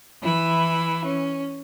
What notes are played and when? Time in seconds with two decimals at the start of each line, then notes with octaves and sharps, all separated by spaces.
0.22 E3 E4
1.04 C#4